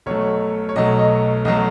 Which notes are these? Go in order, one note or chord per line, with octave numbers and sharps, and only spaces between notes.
B1 B2 F#3 A3 C#5
C#5
B1 B2 F#3 A3 D#5
D#5
B1 B2 F#3 A3 D#5